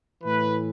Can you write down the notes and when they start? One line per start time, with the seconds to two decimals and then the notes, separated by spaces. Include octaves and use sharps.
0.24 A2 E3 B4